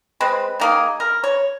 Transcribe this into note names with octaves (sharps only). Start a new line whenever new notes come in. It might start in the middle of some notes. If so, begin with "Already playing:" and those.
G#3 C4 B4
D#3 A#3 G#4
A#4
C#5